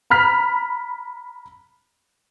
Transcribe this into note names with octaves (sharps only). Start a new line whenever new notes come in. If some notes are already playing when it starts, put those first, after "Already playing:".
A#5 B5 F6 B6